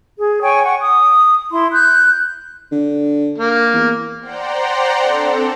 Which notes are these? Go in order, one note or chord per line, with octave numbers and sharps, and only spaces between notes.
G#4
C#5 G5 G#5 C#6
F#5 C#6
D#6
E4 C6
F#6 G6
D3
A#3
E2
C5 D5 F#5 G5 A#5 C6
C4 D4 A4